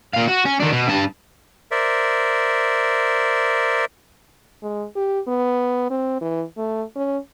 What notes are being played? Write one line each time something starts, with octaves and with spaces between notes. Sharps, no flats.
A#2 F5
F#4
C#4
D#3 D4
B2
G2 A5
A#4 C5 D5 E5
G#3
G4
B3
C4
E3
A3
C#4